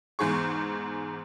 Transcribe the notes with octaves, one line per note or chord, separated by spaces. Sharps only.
E2 G#2 G#4 C#6